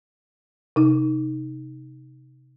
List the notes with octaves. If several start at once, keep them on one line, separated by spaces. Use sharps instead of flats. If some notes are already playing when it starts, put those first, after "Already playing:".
C3 D#4